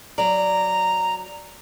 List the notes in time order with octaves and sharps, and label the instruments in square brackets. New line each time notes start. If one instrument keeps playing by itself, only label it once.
[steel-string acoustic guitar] F#3 D5 [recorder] A#5